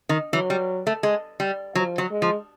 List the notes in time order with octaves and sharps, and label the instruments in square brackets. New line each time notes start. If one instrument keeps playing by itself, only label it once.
[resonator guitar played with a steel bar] D#3
[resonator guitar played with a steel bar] E3 [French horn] F#3
[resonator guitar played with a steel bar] G3
A3
G#3
G3
[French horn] F3 [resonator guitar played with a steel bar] F#3
[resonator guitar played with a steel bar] F#3
[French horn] G#3
[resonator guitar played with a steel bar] F3